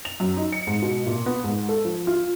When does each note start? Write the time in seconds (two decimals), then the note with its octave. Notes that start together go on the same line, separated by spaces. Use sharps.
0.05 F7
0.20 F#2
0.37 D#4
0.52 C#7
0.67 G#2
0.82 B2
1.06 A#2
1.26 B3
1.44 G#2
1.69 A4
1.85 F3
2.07 F4